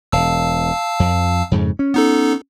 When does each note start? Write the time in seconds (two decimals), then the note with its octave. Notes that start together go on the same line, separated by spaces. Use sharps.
0.12 E1 F5 A5 E6
1.00 F2
1.51 F2 G#2 C#3
1.79 C#4
1.94 B3 D#4 A4